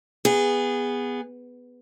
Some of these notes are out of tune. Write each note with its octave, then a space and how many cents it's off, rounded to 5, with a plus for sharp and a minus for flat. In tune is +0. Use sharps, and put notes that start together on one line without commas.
B3 +0 G#4 -20